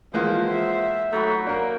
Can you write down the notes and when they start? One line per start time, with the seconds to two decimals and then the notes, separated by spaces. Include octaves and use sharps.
0.14 E3 F3 G#3 A#3 F4 C5 F#5
0.50 E5
1.13 F#3 A3 D#4 F#4 B4
1.47 A#3 D4 A#4